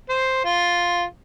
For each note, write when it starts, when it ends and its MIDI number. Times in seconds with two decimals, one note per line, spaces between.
0.09 0.44 72
0.45 1.04 65